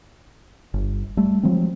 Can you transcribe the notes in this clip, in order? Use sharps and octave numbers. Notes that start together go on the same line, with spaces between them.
G1
G3 A3
F3 F#3 G#3 C4